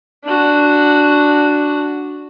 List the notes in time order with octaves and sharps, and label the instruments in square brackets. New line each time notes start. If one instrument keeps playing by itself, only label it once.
[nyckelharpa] D4 F#4